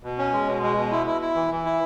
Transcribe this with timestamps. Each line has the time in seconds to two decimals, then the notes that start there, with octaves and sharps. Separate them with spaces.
0.04 B2
0.18 C#4
0.33 G#3
0.47 B2
0.62 G#3
0.77 B2
0.91 E4
1.06 E4
1.22 E4
1.35 E3
1.51 E3
1.65 E4